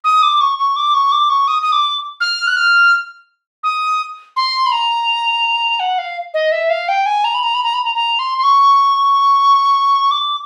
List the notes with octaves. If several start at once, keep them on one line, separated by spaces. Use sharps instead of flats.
D#6
D6
C#6
C#6
D6
C#6
D6
C#6
D#6
D#6
D6
F6
F#6
F6
D#6
C6
B5
A#5
F#5
F5
D#5
E5
F5
G5
G#5
A#5
B5
A#5
B5
A#5
B5
A#5
A#5
C6
C6
C#6
D6